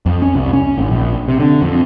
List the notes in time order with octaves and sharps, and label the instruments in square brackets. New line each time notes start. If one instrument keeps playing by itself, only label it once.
[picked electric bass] F2
C#4
C2
C#4
G#1
A#1
C3
D3
F2